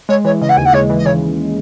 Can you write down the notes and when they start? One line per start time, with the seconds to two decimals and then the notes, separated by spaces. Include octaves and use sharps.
0.09 G#3 C#5
0.24 E3 C#5
0.41 C#3 D#5
0.49 F#5
0.57 D#2 G#5
0.65 F#5
0.73 G#3 C#5
0.90 E3
0.97 D#5
1.05 C#3 C#5